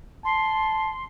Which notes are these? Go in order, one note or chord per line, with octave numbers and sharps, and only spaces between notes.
A5 C6